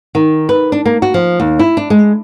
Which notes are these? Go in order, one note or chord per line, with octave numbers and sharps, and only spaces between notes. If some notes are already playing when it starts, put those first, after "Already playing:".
D#3
B4
D4
A#3
F#4
F3
D#2
E4
D4
G#3